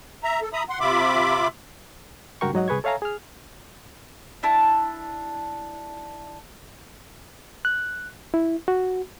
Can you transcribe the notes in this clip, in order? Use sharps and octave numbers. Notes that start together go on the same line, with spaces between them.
E5 A#5
A4
E5 A#5 B5 D#6
F#5 C6
C3 F4 E5 B5 D6
C#2 G2 F#4 A#4 G5 C#6
G#2 F#3 D#5 F#5
C2 G#4 B4 C#6 G#6
A4 C#5 E5 F5 G#5 A#5
G#4 F6
D4 E4 A5
F#6
E4
F#4